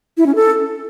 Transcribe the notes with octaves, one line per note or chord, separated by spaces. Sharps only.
E4
C#4
A4